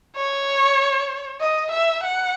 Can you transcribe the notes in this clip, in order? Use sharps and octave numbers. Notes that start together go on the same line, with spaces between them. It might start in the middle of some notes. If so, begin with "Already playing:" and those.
C#5
D#5
E5
F#5